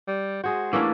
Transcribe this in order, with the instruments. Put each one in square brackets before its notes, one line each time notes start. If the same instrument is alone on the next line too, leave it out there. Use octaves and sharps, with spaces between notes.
[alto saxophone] G3
[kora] G#3 G#4 C5 [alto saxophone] F#4
[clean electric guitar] A2 E3 [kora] A#3 C#4 D4